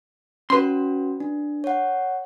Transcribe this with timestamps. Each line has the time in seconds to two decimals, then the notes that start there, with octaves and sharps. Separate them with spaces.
0.50 C#4 F#4 B4 C6
1.20 D4
1.64 C#5 F#5